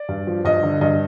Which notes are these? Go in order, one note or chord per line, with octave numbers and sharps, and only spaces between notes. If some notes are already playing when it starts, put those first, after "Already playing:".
Already playing: D5
G2
F3
G2 D#5
D3
G2 D#5